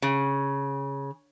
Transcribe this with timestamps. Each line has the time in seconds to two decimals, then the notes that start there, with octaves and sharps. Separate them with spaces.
0.02 C#3